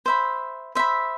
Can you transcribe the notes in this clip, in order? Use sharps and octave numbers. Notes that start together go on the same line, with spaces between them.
C5 E5 B5
C5 E5 B5